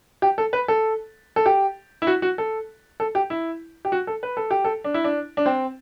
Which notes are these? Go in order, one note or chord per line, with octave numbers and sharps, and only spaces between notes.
G4
A4
B4
A4
A4
G4
E4
F#4
F#4
A4
A4
G4
E4
G4
F#4
A4
B4
A4
G4
A4
D4
E4
D4
D4
C4